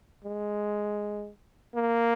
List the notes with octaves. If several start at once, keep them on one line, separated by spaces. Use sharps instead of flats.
G#3
A#3